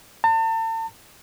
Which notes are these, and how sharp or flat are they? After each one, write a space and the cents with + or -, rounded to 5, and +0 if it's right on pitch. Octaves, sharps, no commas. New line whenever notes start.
A5 +40